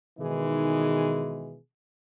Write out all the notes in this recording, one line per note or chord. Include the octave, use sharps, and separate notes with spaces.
B2 D#3 E3 G#3 D#4 G#4